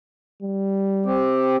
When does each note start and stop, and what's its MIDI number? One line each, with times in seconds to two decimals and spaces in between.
0.43 1.28 55
1.06 1.56 60
1.06 1.56 67